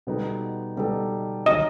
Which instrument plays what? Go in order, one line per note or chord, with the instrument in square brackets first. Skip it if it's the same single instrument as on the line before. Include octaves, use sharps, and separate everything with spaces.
[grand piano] B2 G3 B3 D#4 A4
B2 G3 B3 D#4 A4
[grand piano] D#3 F#3 [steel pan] D#5